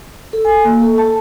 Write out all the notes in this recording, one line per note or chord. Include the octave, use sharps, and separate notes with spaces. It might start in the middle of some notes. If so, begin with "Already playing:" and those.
A4
G#5
A#3
A4
A5